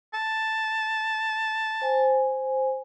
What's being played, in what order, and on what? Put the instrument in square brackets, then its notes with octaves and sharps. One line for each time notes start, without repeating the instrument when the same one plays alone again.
[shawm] A5
[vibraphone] C5 G#5